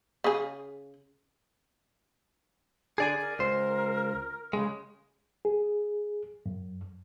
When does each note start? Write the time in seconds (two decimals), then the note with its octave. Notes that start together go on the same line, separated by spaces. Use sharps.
0.24 C#3 G#4
2.98 D3 G#4 D5 G#5
3.21 A#4
3.39 C#2 C5
4.53 C#3 G#3
5.45 G#4
6.46 F#2